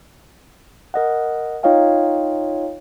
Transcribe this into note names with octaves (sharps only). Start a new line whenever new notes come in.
A#4 D#5 F#5
D#4 F4 C#5 D#5 F5 G5